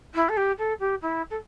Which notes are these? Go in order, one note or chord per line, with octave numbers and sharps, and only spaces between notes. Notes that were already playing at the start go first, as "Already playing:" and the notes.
E4
A4
G4
A4
G4
E4
A4